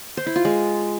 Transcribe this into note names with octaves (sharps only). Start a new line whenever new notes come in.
C5
E4
F4
G#3